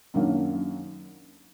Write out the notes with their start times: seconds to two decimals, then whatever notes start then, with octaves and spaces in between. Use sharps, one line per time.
0.14 F#2 D#3 F#3 A#3 D4